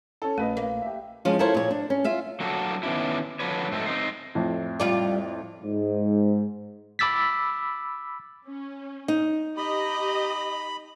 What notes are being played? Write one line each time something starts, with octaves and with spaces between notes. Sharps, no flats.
C#4 A4
A#1 A3 C#4 B4 D#5
A#3
G4 E5
F3 G#3 C#4
E4 F4 A4 A#4 C5 C#5
A#2 C#5
D4
C#4
F4 E5 F5
F#3 A#3 D4 F#4 A4
D#3 B3 C#4 D4 E4
D3 F3 F#3 D4 B4 C#5
G#2 A3 C4 D#4 A4
C4 D#4 C5
F2 A2
G3 F4 D5
G#2
B5 D6 E6 A6 B6
C#4
D#4
G4 D#5 A#5 B5